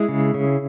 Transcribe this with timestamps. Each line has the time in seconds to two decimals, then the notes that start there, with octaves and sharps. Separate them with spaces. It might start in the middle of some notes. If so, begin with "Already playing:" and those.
Already playing: G#3 E4 G#4
0.09 C#3
0.34 C#3